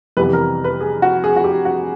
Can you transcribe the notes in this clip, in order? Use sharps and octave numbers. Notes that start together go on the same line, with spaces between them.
F2 C3 E3 G3 B3 B4
A#4
B4
G#4
F#4
G#4
F#4
G4
F#4